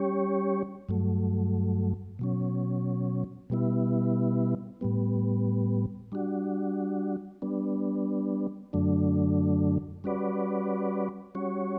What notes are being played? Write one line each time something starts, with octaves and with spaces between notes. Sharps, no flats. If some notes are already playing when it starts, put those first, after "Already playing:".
Already playing: G3 C#4 G4 C#5
G2 F#3 A3
B2 F#3 C#4
B2 G3 B3 E4
A2 G3 B3
G3 D4 F#4
G3 B3 D4
F#2 D3 F#3 A3 D4
G3 C#4 F#4 B4 D5
G3 C#4 F#4 C#5